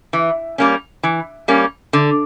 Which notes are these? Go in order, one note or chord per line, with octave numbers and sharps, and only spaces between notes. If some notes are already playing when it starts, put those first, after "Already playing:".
E3
G3 A#3 C#4
E3
G3 A#3 C#4
D3